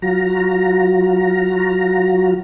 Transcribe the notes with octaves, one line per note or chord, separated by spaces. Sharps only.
F#3 F4 F#4 A#5